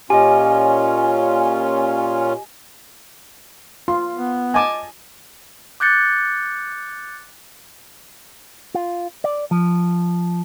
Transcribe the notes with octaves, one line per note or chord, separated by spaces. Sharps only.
A#2 C#4 F4 G4 D#5 G#5
F4 C6
B3
D#5 G#5 A5 D6
D6 F#6 G6 A6 C#7
F4
D5
F3